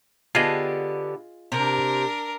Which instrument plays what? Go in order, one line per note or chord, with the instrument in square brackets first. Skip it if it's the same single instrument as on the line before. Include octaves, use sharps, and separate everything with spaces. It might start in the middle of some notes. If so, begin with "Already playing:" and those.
[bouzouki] D3 B3 G4 [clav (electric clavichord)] F4 G#4 D#5
[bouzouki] C3 [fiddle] D4 A#4